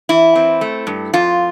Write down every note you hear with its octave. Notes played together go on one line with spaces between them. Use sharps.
E3 E4
C4
A3
G2
F2 F4